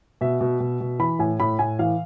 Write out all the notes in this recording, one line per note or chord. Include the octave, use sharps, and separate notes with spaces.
B2 E5
B2
B2
B2
E3 B5
A2 G#5
A2 B5
A2 G#5
E3 F5